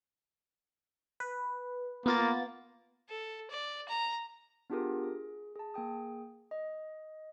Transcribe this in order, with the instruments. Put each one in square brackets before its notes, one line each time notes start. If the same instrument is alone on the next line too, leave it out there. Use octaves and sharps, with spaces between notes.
[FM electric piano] B4
[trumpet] A#3 [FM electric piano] B3 F4 A6
[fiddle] A4
D5
A#5
[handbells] B3 D4 F4 G4 G#4 A#4
G#4
G#4 A5
A#3 G#4 G5 D#6
D#5